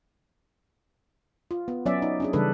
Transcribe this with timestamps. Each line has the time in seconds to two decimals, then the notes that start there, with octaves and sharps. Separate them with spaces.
1.51 F4
1.68 B3
1.86 F#3 B3 C#4 D5 E5
2.02 D#4
2.20 C#4 D4 G#4
2.33 C#3 E3 G3 D4 A4 B4